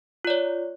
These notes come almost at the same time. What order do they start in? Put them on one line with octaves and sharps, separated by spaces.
F4 D5 C#5